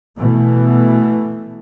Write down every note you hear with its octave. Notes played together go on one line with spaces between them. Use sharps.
B2 E3 A3